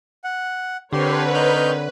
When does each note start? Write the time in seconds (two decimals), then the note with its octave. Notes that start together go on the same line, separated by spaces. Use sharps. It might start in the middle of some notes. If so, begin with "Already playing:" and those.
0.24 F#5
0.93 D3 C4 G4 A#4 B4 C#5 C6
1.34 D#4 F6 G6